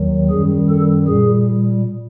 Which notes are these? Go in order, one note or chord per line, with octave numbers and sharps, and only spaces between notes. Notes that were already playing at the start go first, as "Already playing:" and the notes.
Already playing: D#2 D#3 F#3
F#2 D#3 G3 G#4
A4
A#2 G3 G#4